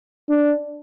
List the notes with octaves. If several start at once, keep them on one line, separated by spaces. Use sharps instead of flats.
D4